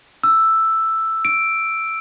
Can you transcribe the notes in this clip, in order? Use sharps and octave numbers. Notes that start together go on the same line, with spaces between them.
E6
D7